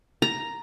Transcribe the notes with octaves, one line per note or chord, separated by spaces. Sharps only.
A#5